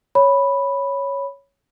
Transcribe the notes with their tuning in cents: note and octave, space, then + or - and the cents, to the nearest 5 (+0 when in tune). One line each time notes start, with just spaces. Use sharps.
C#5 +0 B5 +0